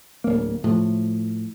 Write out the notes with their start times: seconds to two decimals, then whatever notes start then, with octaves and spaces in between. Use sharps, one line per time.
0.24 D1 A#3
0.64 A2 F3